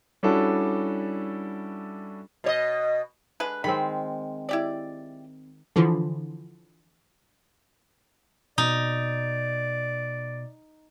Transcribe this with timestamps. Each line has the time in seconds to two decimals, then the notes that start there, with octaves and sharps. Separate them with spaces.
0.23 G3 C#4 D4 E4 F#4 A4
2.44 B2 C#5 D#5
3.40 D3 G#3 B4
3.64 D#3 G#3 C4 B5
4.49 E4 G4 D5
5.76 D3 E3 F3
8.58 B2 D#4 D5